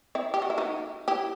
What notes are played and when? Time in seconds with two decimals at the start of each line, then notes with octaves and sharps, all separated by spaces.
0.15 C4 E4
0.34 G4
0.42 F#4
0.50 E4
0.58 D#4 F#4
1.08 E4 G4